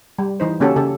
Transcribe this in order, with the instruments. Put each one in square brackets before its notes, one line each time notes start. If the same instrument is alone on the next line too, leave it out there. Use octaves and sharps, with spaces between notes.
[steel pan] G3
E3 D#4 C5
C#3 A#3 C#4 F#4 G4 A4
C#3 G4 A4